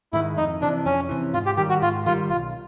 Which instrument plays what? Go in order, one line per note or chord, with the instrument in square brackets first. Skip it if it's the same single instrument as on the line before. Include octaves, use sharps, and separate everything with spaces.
[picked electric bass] G#2 D#3 G#3 [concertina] E4
[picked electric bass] F2 [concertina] D#4
[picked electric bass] C3 E3 [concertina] D4
[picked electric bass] F2 [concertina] C#4
[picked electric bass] C3 E3
[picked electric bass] G#2 [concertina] F4
[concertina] G4
[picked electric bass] D#3 G3 [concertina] G4
[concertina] F#4
[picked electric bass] G#2 [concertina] F4
[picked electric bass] D#3 G3 [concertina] F4
[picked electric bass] B1 [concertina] F4